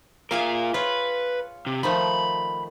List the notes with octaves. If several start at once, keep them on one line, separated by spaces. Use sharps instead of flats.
F4 G#4 A#4 E5 F5
F4 B4 C#5
C3
D#3 F3 A3 B5